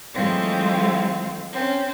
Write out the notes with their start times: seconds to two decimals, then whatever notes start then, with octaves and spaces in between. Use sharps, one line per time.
0.14 E3 F#3 G#3 A3 C4 F4
1.53 C4 C#4